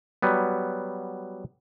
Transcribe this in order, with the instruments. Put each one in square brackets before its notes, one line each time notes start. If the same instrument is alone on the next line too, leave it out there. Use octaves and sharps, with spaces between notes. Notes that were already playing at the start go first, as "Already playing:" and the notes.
[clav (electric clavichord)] F#3 G3 B3